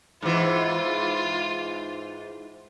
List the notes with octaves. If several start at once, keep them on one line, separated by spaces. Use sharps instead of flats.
G#2 E3 F4